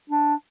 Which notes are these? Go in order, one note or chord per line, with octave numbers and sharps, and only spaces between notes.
D4